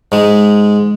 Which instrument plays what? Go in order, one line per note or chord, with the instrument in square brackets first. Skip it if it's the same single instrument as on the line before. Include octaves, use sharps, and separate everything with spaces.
[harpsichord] G#2 G#3